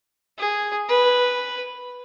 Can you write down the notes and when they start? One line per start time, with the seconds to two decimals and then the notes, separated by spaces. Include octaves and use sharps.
0.38 G#4
0.89 B4